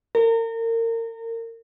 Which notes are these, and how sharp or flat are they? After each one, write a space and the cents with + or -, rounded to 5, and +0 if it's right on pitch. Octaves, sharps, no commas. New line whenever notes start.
A#4 -35